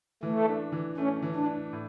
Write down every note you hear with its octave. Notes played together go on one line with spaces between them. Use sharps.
E3 A3
D4
E3
A3 C#4
E3
D4
D4
A2